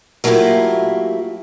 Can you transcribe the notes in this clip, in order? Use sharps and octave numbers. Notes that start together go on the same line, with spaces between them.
F#3 A3 A#3 E4 F4 G4